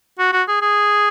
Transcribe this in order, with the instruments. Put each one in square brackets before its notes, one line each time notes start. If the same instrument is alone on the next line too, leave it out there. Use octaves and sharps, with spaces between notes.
[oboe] F#4
F#4
G#4
G#4